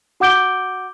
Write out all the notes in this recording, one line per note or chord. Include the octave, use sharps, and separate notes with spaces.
F#4 F#5 D6 G6 D7 G7